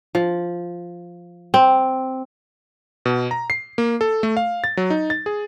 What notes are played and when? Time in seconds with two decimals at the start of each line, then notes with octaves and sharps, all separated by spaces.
0.15 F3
1.54 C4
3.06 B2
3.31 A#5
3.50 C7
3.78 A#3
4.01 A4
4.23 A3
4.37 F5
4.64 A6
4.77 F#3
4.90 D#4
5.10 A6
5.26 G#4